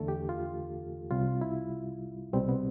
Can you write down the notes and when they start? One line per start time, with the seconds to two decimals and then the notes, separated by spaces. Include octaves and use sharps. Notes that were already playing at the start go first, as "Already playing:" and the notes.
Already playing: E2 D3 A3 A4
0.08 G4
0.29 F4
1.11 C2 C3 G3 F4
1.41 E4
2.33 C2 B2 G3 C4
2.49 B3